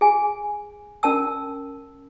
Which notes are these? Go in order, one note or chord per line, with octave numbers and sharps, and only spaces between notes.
G#4 G#5
C#4 A#4 A5 E6